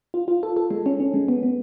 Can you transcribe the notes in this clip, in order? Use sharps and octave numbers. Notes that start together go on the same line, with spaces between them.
F4
F4
A4
A4
G#3
C#4
C#4
G#3
B3
B3